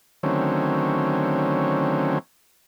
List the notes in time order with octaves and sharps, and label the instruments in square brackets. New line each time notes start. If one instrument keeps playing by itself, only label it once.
[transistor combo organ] D3 D#3 F#3 A3 C4 C#4